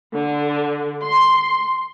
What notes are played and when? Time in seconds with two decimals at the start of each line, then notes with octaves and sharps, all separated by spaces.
0.13 D3
1.02 C6